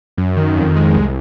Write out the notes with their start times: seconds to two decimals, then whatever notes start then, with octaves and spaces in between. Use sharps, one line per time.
0.18 F#2
0.37 D#3
0.56 F2
0.76 G#3
0.95 C2